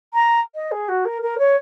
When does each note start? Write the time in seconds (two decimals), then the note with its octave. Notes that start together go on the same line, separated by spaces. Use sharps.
0.13 A#5
0.54 D#5
0.71 G#4
0.88 F#4
1.04 A#4
1.21 A#4
1.38 C#5